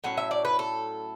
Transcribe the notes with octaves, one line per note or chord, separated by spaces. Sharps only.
A2 F#3 C#4 F#5
E5
D5
B4
A4